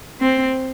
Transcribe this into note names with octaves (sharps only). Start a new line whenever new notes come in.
C4